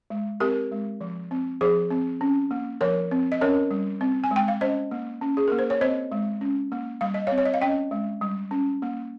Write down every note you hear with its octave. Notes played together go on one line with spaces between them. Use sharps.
G#3
C4 G4 A#4
G#3
F3
C4
F3 G#4 C5
C4
C#4
A#3
F3 A#4 C#5
C4
D#5
C#4 A#4 C#5
G3
C4
G#5
G#3 G5
F5
C#4 C5 D#5
A#3
C#4
G#4
A#3 A#4
C5
C#5
C4 C5 D#5
G#3
C#4
A#3
G3 F5
D#5
C4 C#5 F5
C#5
D#5
F5
C#4 D#5 G5
G#3
G3
C#4
A#3